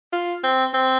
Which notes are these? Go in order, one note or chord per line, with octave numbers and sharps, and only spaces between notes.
F4
C4
C4